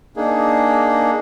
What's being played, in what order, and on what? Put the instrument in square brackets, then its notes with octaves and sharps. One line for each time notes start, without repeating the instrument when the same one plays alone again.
[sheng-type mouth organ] A#3 D4 D#4 G#4